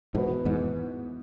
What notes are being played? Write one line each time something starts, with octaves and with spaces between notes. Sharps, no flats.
G#2 B2 E3 B3 F#4 B4
E2 G#2